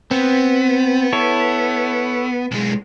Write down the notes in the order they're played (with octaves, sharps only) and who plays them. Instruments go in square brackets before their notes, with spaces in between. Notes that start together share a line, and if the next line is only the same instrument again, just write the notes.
[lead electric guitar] B3 [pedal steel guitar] C4
[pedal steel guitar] E4 A4 C#5
[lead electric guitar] B1 G#3